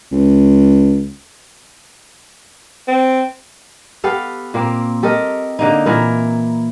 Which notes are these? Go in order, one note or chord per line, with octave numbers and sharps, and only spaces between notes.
C#2
C4
B3 G4 A4 F5
A#2 A#3 C4
G4 A4 A#4 D#5
D3 A#3 D#4
A#2 E3 E4 A#4